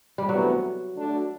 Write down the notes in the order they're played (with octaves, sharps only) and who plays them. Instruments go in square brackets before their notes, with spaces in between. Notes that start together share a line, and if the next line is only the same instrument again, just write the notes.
[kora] G3
[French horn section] D2 C3 E3 B3 [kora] F#3
[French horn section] D3 A3 D4 F#4